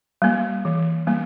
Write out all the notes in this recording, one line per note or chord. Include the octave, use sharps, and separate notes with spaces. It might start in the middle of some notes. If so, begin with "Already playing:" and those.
G3 A#3
E3
G3 A#3